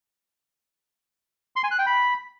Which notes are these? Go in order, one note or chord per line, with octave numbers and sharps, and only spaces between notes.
C6
G#5
F#6
G5
B5